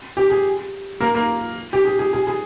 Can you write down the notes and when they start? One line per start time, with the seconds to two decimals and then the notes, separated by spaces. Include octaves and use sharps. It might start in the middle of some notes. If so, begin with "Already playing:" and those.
0.17 G4
0.30 G#4
1.00 A#3 A#4
1.15 A#3 A#4
1.73 G4
1.85 G#4
1.99 G#4
2.13 G#4
2.27 G#4